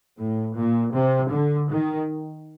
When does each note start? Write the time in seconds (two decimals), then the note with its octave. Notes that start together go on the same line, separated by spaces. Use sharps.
0.18 A2
0.56 A#2
0.94 C3
1.31 D3
1.69 D#3